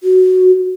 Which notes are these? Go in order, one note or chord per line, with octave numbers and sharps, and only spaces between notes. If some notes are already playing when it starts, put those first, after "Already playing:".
F#4